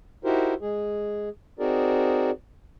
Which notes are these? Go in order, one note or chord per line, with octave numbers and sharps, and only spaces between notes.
D#4 E4 F#4 G4 A#4 C5
G#3 G#4
C4 D#4 F#4 G#4 A#4 D5